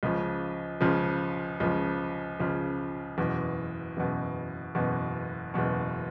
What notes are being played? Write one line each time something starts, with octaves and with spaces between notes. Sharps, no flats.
C#2 C#3 F3
C#2 C#3 F3
C#2 C#3 F3
C#2 C#3 F3
F#1 E2 B2
F#1 E2 B2
F#1 E2 B2
F#1 E2 B2